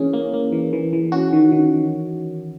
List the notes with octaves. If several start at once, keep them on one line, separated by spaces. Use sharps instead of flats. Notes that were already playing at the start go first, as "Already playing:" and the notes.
Already playing: E3 A#3 C#4 G#4
A#3
A#3
E3
E3
E3
C#4 F#4
D#3
D#3